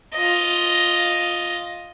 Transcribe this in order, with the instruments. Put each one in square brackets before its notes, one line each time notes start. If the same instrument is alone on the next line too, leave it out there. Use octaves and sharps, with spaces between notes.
[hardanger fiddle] F4 D#5